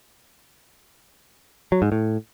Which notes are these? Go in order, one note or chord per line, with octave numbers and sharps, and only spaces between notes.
F#3
G#2
A2